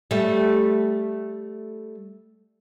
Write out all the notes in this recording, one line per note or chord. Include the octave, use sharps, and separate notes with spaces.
G3 A3